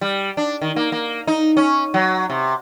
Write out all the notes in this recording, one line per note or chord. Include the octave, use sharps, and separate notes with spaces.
G3
D4
D#3
A#3
A#3
D#4
C#4
F#3
C3